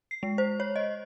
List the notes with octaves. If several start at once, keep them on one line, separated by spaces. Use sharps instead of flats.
C7
G#3
C5
C#5
D#5